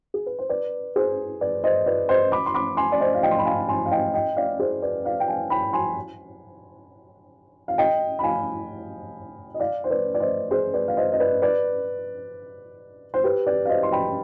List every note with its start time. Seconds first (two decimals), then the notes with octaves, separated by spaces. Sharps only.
0.14 G#4
0.26 B4
0.39 C5
0.49 B4 D5
0.96 G#4 C5
1.41 B4 D5
1.64 C5 D#5
1.86 B4 D5
2.09 C5 D#5
2.32 B5 D6
2.46 C6
2.54 B5 D6
2.77 G#5 C6
2.92 D5
3.00 C5 D#5
3.14 F5
3.23 D#5 G5
3.31 C6
3.39 B5
3.45 F5 G#5
3.68 G#5 C6
3.86 F5
3.91 D#5 G5
4.13 D#5 G5
4.36 D5 F5
4.59 G#4 C5
4.82 B4 D5
5.05 D5 F5
5.20 G5
5.28 F5 G#5
5.50 G5 B5
5.73 G#5 C6
7.68 F5
7.78 D#5 G5
8.19 B5
8.23 F5 G#5
9.54 D#5
9.60 D5 F5
9.84 C5
9.90 B4 D5
10.14 D5
10.20 C5 D#5
10.51 G#4 C5
10.74 B4 D5
10.88 F5
10.97 C5 D#5
11.13 D#5
11.20 B4 D5
11.42 B4 D5
13.14 C5
13.24 G4 B4
13.46 B4 D5
13.65 F5
13.69 C5 D#5
13.83 C6
13.92 G5 B5